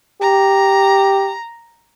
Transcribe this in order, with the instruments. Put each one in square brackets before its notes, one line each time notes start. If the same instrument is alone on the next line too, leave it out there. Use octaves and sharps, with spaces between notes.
[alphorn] G4 [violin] A#5